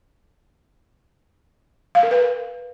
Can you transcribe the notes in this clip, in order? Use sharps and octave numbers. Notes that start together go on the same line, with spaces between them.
F5
A#4
B4